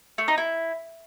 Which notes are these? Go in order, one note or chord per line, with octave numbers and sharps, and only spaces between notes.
A3
D#4
E4